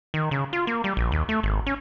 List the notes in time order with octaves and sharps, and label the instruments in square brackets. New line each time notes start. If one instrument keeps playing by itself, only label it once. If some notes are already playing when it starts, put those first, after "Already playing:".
[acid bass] D#3
C#3
F4
A#3
G3
A#1
D#2
A3
G#1
C#4